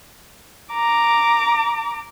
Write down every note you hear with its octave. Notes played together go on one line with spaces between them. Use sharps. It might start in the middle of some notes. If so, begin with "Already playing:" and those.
A#5 D6